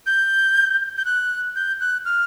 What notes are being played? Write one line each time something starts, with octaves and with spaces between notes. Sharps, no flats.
G6
G6
F#6
G6
F#6
F6